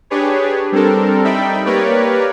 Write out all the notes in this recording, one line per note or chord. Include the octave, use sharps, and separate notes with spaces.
D4 G4 G#4 B4 C#5
G3 C4 D4 A4 A#4
G3 D#4 D5 E5 G5 B5
A#3 G4 A#4 B4 C#5 D5